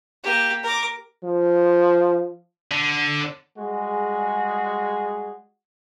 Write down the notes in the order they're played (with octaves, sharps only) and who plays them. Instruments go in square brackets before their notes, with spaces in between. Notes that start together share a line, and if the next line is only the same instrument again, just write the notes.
[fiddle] A#3 G4
A#4 D6
[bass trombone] F3
[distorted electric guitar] D3
[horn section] G3 G#3 F#4 G#4